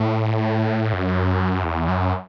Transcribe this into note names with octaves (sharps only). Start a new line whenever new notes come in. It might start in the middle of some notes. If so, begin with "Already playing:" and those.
Already playing: A2
F#2
E2
F#2